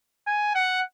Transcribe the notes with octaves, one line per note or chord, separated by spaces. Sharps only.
G#5
F#5